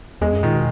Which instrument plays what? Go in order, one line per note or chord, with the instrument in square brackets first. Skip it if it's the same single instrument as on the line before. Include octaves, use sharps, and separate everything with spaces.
[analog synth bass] E2 [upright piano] G#3
[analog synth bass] F#2
[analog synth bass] A#2 [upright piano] D#3
[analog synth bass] B2